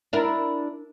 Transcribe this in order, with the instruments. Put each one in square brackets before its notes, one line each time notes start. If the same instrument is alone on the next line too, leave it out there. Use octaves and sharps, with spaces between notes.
[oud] D4 E4 A#4